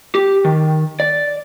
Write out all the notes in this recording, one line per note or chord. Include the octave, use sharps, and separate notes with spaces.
G4
D#3
D5